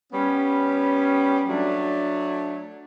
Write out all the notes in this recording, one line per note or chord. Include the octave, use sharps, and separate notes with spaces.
G3 B3 C#4
F#3 A3 D4